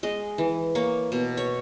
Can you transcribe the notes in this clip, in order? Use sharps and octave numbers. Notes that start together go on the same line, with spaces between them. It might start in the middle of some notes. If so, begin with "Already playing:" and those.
G#3 D#5
E3
A#3 C#5
B2
C#5